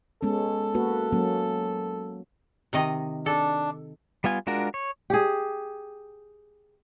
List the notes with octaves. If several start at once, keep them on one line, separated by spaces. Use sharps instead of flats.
G#3 B3 C#4 A4
A#3 F#4 B4
F#3 A#3 C#4
C3 D#3 D#5
D4 A4
G3 B3 F4 G#5
G#3 D4 F4 F#4 A#4
C#5
G4 G#4